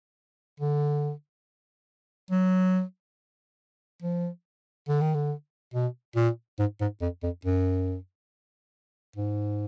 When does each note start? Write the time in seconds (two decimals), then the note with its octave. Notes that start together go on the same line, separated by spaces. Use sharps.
0.60 D3
2.31 F#3
4.02 F3
4.88 D3
5.01 D#3
5.14 D3
5.74 B2
6.16 A#2
6.59 G#2
6.81 G#2
7.01 F2
7.23 F2
7.45 F#2
9.16 G#2